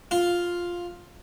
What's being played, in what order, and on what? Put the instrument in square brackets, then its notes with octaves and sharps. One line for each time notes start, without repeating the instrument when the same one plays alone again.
[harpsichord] F4